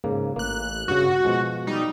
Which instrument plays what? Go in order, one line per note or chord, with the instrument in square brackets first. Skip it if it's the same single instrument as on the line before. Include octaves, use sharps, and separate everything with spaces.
[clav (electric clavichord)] G#2 C#3 A#3
[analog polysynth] A1 F#6 [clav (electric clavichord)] A#3
[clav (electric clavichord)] G2 C#3 [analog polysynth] F#4
[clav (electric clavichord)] F#5
B2 F3 G#3
[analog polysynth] G3 D#4